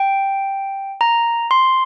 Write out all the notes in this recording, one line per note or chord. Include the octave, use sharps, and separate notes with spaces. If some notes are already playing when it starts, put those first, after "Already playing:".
Already playing: G5
A#5
C6